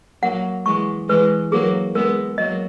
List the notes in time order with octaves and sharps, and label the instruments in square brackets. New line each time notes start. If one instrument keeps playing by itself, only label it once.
[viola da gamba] F#3 A#3 [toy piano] F#5
[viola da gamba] E3 G#3 [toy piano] C#6
[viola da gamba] E3 G#3 [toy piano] B4
[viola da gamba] F#3 A#3 [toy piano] G#4
[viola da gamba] G#3 B3 [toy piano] A#4
[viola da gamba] F#3 A#3 [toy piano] D#5